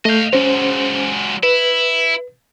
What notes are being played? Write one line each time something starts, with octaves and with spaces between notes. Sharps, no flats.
A3 D#5 F5 G6
F#3 G#3 C#4 C5
E4 B4